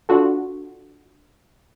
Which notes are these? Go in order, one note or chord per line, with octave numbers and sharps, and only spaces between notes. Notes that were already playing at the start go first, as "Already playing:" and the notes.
D4 F4 F#4 A4